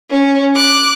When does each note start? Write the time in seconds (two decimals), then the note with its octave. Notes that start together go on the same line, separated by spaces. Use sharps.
0.10 C#4
0.55 D6 F#6